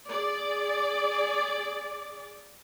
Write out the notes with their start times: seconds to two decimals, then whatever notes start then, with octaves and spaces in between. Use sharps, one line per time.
0.10 G#4 D5